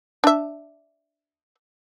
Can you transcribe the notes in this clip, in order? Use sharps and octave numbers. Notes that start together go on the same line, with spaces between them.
D4 E5